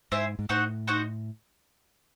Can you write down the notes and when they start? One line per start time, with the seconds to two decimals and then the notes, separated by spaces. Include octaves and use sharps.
0.12 G#2 E4 C5 E5 G#5
0.39 G#2
0.49 A2 D#4 F#4 C5 F#5
0.87 D#4 F#4 C5 F#5